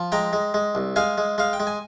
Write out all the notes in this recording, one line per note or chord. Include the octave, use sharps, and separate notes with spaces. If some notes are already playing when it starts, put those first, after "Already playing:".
Already playing: F3
G#3 G5 A#5
G#3
G#3
C2
G#3 F5 G#5
G#3
G#3 F5
G5
G#3
G#5